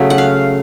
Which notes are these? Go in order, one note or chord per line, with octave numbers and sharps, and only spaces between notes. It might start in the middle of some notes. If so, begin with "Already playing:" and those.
Already playing: C#3 F#3 A3
F#5
F5